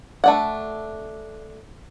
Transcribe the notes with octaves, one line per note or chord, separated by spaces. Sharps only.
A3 D4 F#5